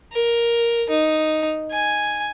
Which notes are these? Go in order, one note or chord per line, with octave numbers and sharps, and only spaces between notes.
A#4
D#4
G#5